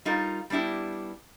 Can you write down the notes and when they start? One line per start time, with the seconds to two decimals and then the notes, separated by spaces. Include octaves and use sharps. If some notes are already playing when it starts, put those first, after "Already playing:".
0.05 G3 D#4 F4 A#4
0.50 G3 B3 D4 E4 G4